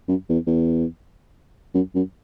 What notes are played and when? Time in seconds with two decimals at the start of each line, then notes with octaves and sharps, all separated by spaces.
0.08 F#2
0.29 E2
0.47 E2
1.74 F#2
1.95 F#2